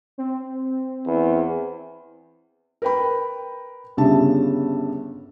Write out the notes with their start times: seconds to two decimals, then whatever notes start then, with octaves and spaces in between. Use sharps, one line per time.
0.18 C4
1.07 E2
2.82 A#4 B4 G5 B5
3.97 G1 G2 C#3 G3 E5 A5